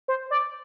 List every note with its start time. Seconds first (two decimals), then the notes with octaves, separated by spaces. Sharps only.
0.08 C5
0.31 D5